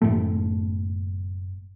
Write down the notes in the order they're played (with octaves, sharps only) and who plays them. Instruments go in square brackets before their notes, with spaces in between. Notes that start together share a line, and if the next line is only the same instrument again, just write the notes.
[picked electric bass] F#1 C#2 A2 A3